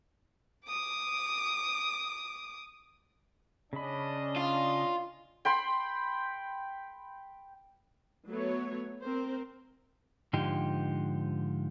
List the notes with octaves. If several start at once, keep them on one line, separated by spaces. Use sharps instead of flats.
D6 D#6
C#3 C#4 D4 D#5 B5
F4
G5 B5 C6
F#3 A3 B3 C#5
C4 A#4 C5
G#2 D3 F3 D#4 G4